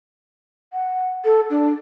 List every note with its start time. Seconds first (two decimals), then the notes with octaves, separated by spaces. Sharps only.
0.73 F#5
1.25 A4
1.50 D4